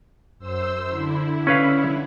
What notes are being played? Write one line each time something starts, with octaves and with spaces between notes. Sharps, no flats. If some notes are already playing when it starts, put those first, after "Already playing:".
F#2 C5 E6
D3 E4
C#4 B4 F5